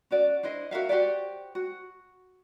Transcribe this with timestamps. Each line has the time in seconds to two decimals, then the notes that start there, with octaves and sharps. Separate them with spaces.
0.11 C#4 F#4 D5
0.43 D4 E4 C5 D#5
0.71 F#4 A#4 E5 F5
0.89 F#4 G4 C5 D5
1.55 F#4